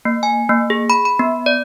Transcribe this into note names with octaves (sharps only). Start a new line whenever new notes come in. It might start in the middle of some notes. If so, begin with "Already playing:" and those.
A#3
G#5
A#3
G#4
B5
B5
B3
D5